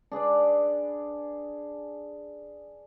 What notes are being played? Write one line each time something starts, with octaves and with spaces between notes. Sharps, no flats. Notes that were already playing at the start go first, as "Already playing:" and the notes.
D4 G#4 B4 D5